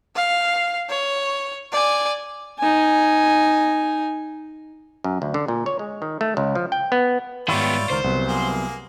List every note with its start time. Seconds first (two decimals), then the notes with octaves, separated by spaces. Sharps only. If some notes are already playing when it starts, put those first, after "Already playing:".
0.16 F5
0.89 C#5
1.73 D5 G#5
2.59 D#4 G#5
5.04 F#2
5.22 D2
5.34 D3
5.48 A#2
5.66 C#5
5.79 G#3
6.02 D#3
6.21 A3
6.37 C#2
6.55 F3
6.72 G5
6.92 B3
7.48 G#2 D#3 G3 B3 E4 F4 C#5 D5
7.90 C#2 D#3 A#4 C5
8.04 C2 F#3 B3
8.28 A#3 G#4